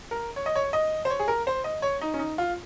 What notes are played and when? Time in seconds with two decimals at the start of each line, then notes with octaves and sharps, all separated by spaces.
0.11 A#4
0.36 C#5
0.46 D#5
0.56 C#5
0.73 D#5
1.05 C5
1.10 C#5
1.19 G#4
1.28 A#4
1.47 C5
1.64 D#5
1.82 C#5
2.01 D#4
2.14 C#4
2.19 D#4
2.38 F4